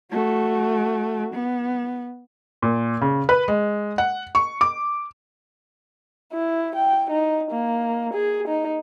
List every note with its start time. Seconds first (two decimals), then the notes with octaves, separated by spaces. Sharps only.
0.12 A3 F#4
1.33 B3
2.62 A#2
3.01 C#3
3.29 B4
3.48 G#3
3.98 F#5
4.35 C#6
4.61 D6
6.33 E4
6.75 G5
7.11 D#4
7.51 A#3
8.14 G#4
8.48 D#4